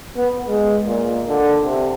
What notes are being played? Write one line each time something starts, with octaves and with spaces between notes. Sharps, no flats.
B3
G#3
A#2
D3
C3